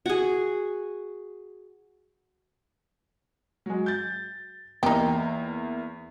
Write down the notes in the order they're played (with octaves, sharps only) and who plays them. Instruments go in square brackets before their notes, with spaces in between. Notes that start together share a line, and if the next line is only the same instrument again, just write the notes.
[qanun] F#4 G#4
[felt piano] F#3 G#3
G6 A6
[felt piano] E2 A#3 [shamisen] D#4 G4